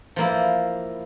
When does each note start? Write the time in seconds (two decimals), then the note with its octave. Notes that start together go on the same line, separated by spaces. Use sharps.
0.16 F3 A#3 E4